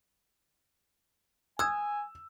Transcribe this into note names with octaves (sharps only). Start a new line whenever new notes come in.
G#5 D#6 E6 F#6 G#6